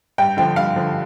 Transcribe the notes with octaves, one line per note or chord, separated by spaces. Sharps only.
G2 G5
D3 F3 G5
G2 F5
D3 F3